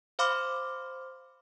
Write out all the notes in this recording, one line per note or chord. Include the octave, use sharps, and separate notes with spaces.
C5 F5 B5 C6 D6 F6